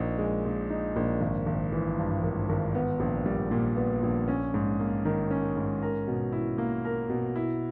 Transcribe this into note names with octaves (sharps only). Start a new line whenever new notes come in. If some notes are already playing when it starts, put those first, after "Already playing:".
Already playing: A#1 D#4
G#3
A#2
D#4
A#1
G#1
G#1
E3
G2
G#1
G#1
B3
A#1
G3
A#2
B3
A#1
C#4
G#2
A#3
D#3
C#4
G#2
A#4
B2
E4
A#3
A#4
B2
E4